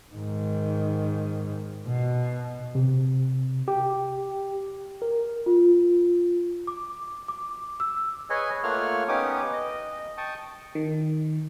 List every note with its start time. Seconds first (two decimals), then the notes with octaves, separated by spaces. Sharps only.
0.15 G#2 D#3
1.87 B2
2.75 C3
3.68 G4
5.02 A#4
5.46 F4
6.67 D6
7.28 D6
7.80 E6
8.30 G#4 B4 C#5 D#5 G#5
8.63 A3 A#3 F4 C#5 F#5 F6
9.08 B3 C#4 D#4 G4 D6 D#6
9.53 D#5
10.18 G5 A5 C#6 D#6
10.75 D#3